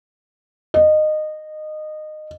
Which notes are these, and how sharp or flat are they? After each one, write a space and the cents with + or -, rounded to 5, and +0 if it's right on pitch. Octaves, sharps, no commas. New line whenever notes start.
D#5 -20